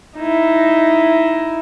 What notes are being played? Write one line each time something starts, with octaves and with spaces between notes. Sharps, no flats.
D#4 E4